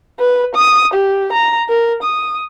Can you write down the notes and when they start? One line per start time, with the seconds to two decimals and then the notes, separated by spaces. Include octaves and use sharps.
0.19 B4
0.55 D#6
0.93 G4
1.32 A#5
1.69 A#4
2.02 D#6